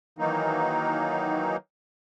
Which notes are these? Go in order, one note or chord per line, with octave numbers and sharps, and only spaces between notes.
D#3 E3 F#3 A#3 D#4